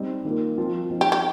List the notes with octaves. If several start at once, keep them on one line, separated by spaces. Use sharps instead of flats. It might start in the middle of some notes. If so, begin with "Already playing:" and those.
Already playing: G3 C4 D#4
D#3 A#3 F4
F3 C4 F4
F3 C4 D#4
G4
G4